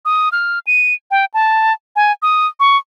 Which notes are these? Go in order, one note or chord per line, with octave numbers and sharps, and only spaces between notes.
D#6
F6
D#7
G5
A5
G#5
D#6
C#6